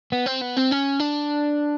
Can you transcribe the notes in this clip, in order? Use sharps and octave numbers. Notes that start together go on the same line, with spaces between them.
B3
C4
B3
C4
C#4
D4